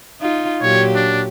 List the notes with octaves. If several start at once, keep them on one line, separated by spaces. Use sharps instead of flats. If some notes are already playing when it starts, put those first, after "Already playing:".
D#4 F4
A#2 F#3 G4 C#5
D4